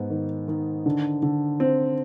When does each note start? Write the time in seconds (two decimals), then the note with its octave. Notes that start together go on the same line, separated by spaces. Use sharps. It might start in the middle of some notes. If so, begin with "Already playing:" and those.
Already playing: G#2 B3
0.10 D#3
0.48 D#3
0.86 D3
1.22 D3
1.60 C4